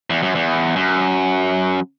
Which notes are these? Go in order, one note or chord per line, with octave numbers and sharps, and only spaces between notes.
E2
F#2
E2
F#2